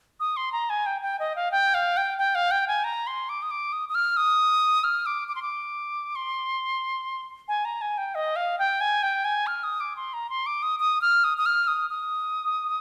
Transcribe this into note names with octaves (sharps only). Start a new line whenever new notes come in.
D#6
C6
A#5
G#5
G5
G5
D#5
F5
G5
F5
G5
G5
F5
G5
G#5
A#5
C6
D6
D#6
D6
D#6
D#6
F6
D#6
F6
D6
D6
C6
D6
C6
G#5
A#5
G#5
G5
D#5
F5
G5
G#5
G5
G#5
F6
D#6
D6
C6
A#5
C6
D6
D#6
D#6
F6
D#6
D#6
F6
D#6
D#6